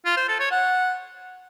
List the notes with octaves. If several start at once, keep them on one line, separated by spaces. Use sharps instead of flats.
F4
C5
A4
C#5
F#5